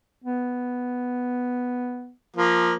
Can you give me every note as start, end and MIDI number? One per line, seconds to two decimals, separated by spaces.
0.24 2.12 59
2.37 2.75 53
2.37 2.75 58